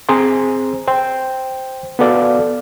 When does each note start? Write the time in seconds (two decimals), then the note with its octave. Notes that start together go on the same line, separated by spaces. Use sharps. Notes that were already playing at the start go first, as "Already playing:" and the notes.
0.09 C4 G#4 C5 A#5 C6
0.88 C5 G5
1.99 B3 F#4 A4 D5 F5